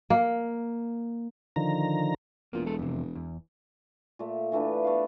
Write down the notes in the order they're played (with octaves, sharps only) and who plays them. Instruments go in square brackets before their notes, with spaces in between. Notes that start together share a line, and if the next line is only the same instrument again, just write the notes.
[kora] A#3
[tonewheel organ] D3 D#3 F3 A#5
[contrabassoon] E1 [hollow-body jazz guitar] A#3 F4
[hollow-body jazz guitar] G#3 A4
F2 C3
E2
[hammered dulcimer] A#2 A3
E3 A3 D4 B4
A3 B3 F5